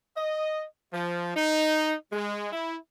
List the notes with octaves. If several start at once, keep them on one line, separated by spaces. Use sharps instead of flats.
D#5
F3
D#4
G#3
E4